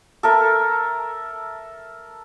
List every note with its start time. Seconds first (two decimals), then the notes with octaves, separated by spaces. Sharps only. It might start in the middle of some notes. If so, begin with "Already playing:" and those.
0.23 A4 A#4 E5